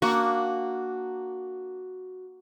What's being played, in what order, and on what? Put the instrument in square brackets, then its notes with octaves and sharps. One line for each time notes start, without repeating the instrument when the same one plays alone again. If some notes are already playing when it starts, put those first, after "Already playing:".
[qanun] A#3 D4 [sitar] F#4